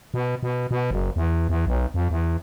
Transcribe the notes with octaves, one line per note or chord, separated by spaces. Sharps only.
B2
B2
B2
F#1
E2
E2
B1
F2
E2